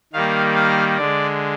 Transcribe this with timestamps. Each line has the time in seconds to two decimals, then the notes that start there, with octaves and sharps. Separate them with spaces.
0.13 D#3 G3 A#3 F5
0.55 F5
0.97 D3 G#3 D5